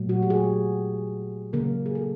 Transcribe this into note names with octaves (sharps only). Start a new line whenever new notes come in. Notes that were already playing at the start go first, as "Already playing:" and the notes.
Already playing: A#2 F#3 A3
F#4
G4
G#4
C#3 F#3 A#3 A#4
G#4
A4